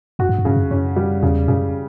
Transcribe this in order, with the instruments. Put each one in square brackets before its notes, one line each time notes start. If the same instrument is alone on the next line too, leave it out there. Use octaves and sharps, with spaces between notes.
[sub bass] F#2 [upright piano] F#4
[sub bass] G2
F#2
[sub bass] G2 [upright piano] C#3
[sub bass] F#2
[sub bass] F#2 [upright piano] C#4
[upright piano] G3
[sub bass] E2 [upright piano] C#3
[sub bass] F#2 [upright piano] C#3